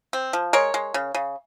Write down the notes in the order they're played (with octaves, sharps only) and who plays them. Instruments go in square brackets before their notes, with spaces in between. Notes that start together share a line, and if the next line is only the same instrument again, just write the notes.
[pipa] C4
F3
G#3 A#4 C#5
G#3
C#3
C#3